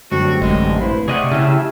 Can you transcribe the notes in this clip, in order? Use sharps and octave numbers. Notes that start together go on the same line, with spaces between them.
F#2 D3 G3 A3 C4 F#4
A1 G#3
E4 B4 C5
C3 A3 G#4 D5 D#5 F#5
C#3 E4 G4 E5 G#5 A5 F6